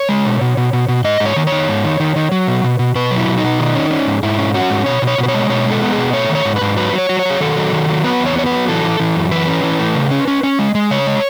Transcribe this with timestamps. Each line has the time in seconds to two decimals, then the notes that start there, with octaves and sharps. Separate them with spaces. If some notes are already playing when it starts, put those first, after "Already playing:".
Already playing: C#5
0.09 G#3
0.25 B2
0.41 B2
0.57 B2
0.73 B2
0.88 B2
1.04 G#2 D#5
1.20 G#2
1.25 C#5
1.36 D#3
1.47 C#5
1.52 D#3
1.69 G#2
1.84 D#3
2.00 D#3
2.16 D#3
2.32 F#3
2.48 B2
2.64 B2
2.79 B2
2.95 B2 B4
3.11 F#3
3.16 E4
3.28 B2
3.38 D#4
3.43 B2
3.59 D#3
3.75 C#4
3.91 C#4
4.07 G#2
4.23 G#2 E4
4.38 C#4
4.54 C#4 F#4
4.70 G#2
4.86 B2 C#5
5.02 B2
5.07 C#5
5.18 B2
5.23 B4
5.28 C#5
5.34 G#3
5.50 B2 C#5
5.66 G#3
5.71 A4
5.82 B3
5.92 G#4
5.97 B2
6.13 A3 C#5
6.29 D#3
6.35 C#5
6.45 G#2
6.56 B4
6.61 G#2
6.77 F#3 B4
6.93 F#3
6.98 C#5
7.09 F#3
7.19 C#5
7.25 F#3 G#4
7.41 D#3 A4
7.56 F#3
7.72 D#3
7.89 F#3
8.04 B3 B4
8.20 E2
8.26 C#5
8.36 B3 C#5
8.46 B4
8.52 F#3
8.68 E3 A4
8.84 E3
9.00 E3
9.16 F#2
9.31 E3 B4
9.47 C#4
9.63 E3
9.79 A3
9.95 C#3
10.11 C#4
10.28 C#4
10.43 C#4
10.59 G#3
10.75 G#3
10.91 C#3 C#5
11.07 G#3